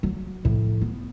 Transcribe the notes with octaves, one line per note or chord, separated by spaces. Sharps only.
F#3
A2 F3
B3